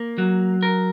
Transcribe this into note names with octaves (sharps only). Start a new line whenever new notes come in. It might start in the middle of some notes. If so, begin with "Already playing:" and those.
Already playing: A#3
F#3
A#4